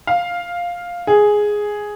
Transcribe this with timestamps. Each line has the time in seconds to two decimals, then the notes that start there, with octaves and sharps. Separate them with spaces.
0.07 F5
1.07 G#4